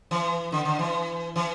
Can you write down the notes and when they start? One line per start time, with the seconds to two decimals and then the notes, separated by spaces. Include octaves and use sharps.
0.11 E3
0.52 D3
0.65 D3
0.79 E3
1.36 E3